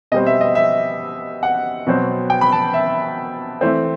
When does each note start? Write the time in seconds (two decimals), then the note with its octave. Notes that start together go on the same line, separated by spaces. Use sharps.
0.12 B2 G3 C4 D#5
0.26 E5
0.41 D#5
0.55 E5
1.43 F#5
1.87 B2 F#3 C4
2.30 G5
2.41 B5
2.52 A5
2.74 E5
3.61 E3 A3 C4